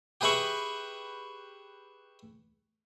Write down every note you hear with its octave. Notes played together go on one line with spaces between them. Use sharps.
G4 G#4 B4 E5 B5 C#6